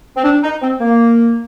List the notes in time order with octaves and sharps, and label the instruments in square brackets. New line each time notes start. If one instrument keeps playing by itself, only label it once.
[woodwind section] C4
D4
D#4
C4
A#3